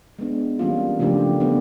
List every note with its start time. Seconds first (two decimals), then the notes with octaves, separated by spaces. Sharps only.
0.19 G#3 B3 D4
0.59 E3 G3 A#3 C#4 F4
0.99 C#3 F3 A3 D4 G4
1.40 G3 B3 D4